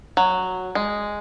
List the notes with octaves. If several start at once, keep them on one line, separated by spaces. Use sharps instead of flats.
F#3
G#3